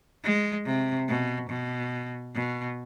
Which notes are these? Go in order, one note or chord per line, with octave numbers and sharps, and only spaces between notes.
G#3
C3
B2
B2
B2